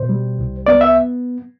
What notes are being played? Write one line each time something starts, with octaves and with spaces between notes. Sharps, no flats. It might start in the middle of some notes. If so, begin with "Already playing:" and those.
Already playing: B2 C5
G3
C2
B3 D5
E5